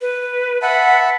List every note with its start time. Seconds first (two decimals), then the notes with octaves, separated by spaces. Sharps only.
0.01 B4
0.62 E5 F#5 A5 B5